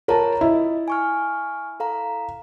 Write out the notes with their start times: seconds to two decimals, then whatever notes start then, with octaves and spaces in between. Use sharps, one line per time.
0.08 F4 A#4 C#5 A5 A#5
0.41 E4 D#5
0.88 G#5 C#6 F6
1.80 A4 F5 A#5